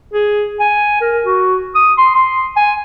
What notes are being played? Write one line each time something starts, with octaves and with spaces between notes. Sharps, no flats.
G#4
G#5
A#4
F#4
D#6
C6
C6
G#5